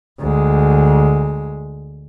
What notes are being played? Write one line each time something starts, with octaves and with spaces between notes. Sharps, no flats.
D2 G#3